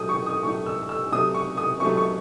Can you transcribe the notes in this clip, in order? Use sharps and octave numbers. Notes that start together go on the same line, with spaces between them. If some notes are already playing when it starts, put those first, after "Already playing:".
Already playing: A2 F#3 A3 D#6
C#6
D#6
A2 F#3 A3 C#6
E6
E6
C3 F#3 A3 D#6
C#6
D#6
C3 F#3 A3 C#6
C#6